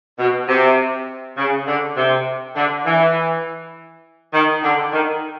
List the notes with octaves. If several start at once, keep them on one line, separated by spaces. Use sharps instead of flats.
B2
C3
C#3
D3
C3
D3
E3
D#3
D3
D#3